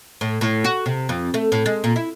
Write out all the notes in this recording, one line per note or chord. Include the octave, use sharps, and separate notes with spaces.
A2
A2
F#4
C3
F2
A3
A2
G#3
A#2
E4